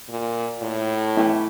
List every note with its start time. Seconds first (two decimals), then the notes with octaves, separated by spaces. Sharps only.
0.09 A#2
0.62 A2
1.17 E3 A3 E4 G4